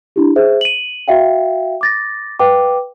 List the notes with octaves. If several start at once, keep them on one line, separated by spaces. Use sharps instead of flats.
D4 E4 G4
G#4 C5 E5
D#7 F#7
F#4 E5 F5 G5
D6 A6 A#6
B4 F5 G5 D6